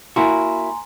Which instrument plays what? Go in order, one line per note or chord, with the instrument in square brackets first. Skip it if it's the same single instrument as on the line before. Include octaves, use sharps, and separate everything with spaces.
[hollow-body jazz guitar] A#3 E4 F#4 [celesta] G#5 A#5 C6